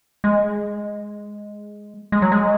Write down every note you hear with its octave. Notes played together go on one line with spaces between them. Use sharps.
G#3
G#3
F#3
G#3